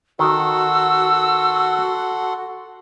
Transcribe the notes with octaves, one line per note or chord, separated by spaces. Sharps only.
D#3 F#4 A4 F#5 C6 E6